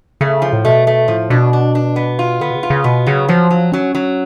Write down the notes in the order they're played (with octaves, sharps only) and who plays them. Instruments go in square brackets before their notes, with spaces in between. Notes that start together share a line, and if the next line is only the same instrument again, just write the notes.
[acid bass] C#3 [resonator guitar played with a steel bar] A3
[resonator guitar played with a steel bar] F3
[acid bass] A2
[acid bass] B2 [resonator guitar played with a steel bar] A3
[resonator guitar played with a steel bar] A3
[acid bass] A2 [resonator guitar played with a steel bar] F3
[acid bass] B2 [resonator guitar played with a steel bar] D4
[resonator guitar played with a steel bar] D4
D4
B3
F4
[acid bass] D3 [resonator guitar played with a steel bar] B3
[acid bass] B2
C#3
[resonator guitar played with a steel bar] F4
[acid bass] C#3
[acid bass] B2 [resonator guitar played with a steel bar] B3
[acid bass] C#3 [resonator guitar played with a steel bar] F#3
[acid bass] F3 [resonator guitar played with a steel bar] F#3
[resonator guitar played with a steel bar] F#3
[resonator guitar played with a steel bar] F#3 [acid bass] C#4
[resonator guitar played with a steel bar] F#3